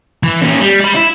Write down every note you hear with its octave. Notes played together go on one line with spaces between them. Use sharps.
E3
A#2 C#4
G3
D5 B5
E4